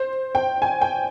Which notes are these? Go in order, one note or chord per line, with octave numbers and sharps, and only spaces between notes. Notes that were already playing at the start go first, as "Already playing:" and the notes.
Already playing: C5
G5
G#5
G5